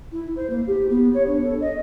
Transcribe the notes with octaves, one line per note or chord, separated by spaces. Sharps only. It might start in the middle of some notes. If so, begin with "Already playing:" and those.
E4
C5
A#3
G4
B3
C#5
D4
A4
D#5